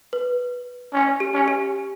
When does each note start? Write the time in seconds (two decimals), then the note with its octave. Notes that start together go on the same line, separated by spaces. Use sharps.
0.13 B4
0.93 C#4
1.20 G4
1.34 C#4
1.48 G4